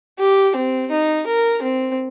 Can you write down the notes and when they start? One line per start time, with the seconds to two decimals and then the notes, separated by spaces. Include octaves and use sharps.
0.19 G4
0.55 C4
0.91 D#4
1.26 A#4
1.62 C4